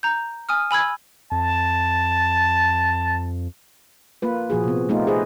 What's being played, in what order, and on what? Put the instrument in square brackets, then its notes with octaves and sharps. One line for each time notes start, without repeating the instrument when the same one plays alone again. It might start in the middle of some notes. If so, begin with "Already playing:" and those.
[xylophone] A#5 G6
G#5 D#6 F6
G#5 B5 E6 G#6
[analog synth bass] F2 [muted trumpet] A5
[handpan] A#3 F4 B4
A#2 F3 F#4 G#4
C3 B3
A3 B3 D#4 F4 G4
G#4 A4 B4 C5 D#5